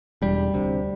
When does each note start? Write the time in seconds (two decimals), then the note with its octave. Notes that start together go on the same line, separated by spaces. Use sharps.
0.22 E1 G3
0.54 D2 C3